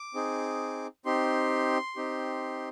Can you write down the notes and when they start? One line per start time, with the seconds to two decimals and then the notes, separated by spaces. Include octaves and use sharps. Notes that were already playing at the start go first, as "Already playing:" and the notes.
Already playing: D6
0.14 C4 D#4 G#4
1.05 C4 D#4 G4 C6
1.96 C4 D#4 G4